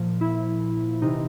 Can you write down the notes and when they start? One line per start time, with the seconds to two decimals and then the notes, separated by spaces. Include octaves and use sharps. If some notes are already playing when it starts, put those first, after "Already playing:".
Already playing: A#2 F3
0.21 E4
1.02 C3 E3 D#4